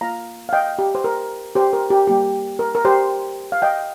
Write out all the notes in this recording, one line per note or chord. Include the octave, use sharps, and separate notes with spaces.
A#3 F4 F5 A#5
F5
D#5 G5
G4
C5
A#4
G4 C5
A#4
G4
G3 A#3 G4
A#4
A#4
G4 C5
F5
D#5 G5